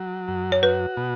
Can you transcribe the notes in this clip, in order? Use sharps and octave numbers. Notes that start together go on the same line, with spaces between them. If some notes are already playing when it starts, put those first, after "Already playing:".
Already playing: F#3
F#2
C#5
F#4 B4
B2